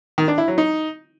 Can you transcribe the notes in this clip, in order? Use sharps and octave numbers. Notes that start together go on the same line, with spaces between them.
D#3
D4
E4
F#3
D#4